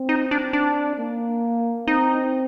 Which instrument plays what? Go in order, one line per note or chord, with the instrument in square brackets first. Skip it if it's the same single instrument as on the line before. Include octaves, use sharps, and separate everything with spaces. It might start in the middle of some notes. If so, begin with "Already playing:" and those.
Already playing: [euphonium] C4
[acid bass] D#4
D4
D4
[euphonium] A#3
[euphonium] C4 [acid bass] D#4